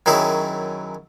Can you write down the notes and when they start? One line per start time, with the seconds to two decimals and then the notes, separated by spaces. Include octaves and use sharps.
0.06 F#2 D#3 F#3 E4 G#4